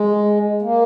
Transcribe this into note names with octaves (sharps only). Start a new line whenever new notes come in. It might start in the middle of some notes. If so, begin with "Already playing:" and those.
Already playing: G#3
A#3